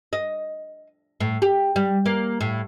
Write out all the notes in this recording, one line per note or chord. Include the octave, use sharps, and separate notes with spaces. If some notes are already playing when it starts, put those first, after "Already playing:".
D#5
A2
G4
G3
A#3
A2